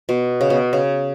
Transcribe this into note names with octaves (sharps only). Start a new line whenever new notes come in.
B2
C#3
B2
C#3